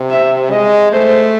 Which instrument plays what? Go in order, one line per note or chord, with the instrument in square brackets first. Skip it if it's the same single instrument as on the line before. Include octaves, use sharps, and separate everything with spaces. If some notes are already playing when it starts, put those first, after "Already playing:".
Already playing: [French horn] C3
[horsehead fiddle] E5
[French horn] G#3 [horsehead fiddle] D#5
[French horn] A3 [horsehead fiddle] C5